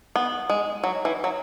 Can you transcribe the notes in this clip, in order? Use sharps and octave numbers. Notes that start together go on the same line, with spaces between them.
B3
G#3
F#3
E3
F#3